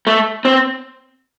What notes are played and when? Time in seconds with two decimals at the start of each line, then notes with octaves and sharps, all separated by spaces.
0.07 A3
0.45 C4